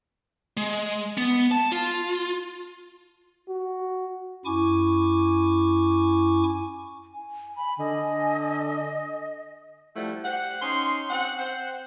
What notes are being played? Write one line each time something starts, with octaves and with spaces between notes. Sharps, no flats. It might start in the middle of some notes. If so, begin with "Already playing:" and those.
G#3
B3
A5
F4
F#4
F#2 E4 G#5 C#6 D6
G#5
B5
D3 D#5
F3 G3 A3 E4 F#5
G4 C5 F#5
C#4 D#4 C6
C4 F#5
C4 C5 F#5